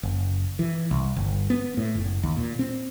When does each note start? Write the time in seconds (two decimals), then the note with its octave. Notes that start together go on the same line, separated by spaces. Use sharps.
0.03 F#1
0.59 E3
0.91 C2
1.16 G1
1.50 B3
1.77 A2
1.95 F#1
2.23 D#2
2.36 A#2
2.59 C4